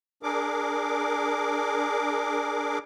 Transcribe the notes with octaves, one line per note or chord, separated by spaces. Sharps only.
D4 G#4 A#4 D6